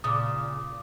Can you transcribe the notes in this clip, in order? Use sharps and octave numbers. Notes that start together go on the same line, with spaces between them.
A#2 C#3 D6 D#6